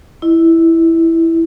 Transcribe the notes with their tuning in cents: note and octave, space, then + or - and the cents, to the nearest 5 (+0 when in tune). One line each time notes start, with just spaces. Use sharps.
E4 +0 D#5 +0